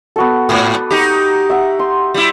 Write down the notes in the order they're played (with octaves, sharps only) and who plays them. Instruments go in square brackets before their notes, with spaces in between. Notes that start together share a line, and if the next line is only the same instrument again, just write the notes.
[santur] B3 F#4 A4
[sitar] G#2 [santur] F#5 D#6
[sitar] D#4 G4 [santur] A#5
[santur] E5 F#5
C6
[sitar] G3 E4